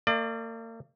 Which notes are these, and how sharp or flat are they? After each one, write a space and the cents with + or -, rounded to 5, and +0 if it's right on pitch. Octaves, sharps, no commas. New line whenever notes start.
A#3 -40 D5 +30